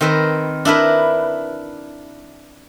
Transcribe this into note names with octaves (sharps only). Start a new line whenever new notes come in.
D#3 C4 A#4 B4
D4 E4 A#4 B4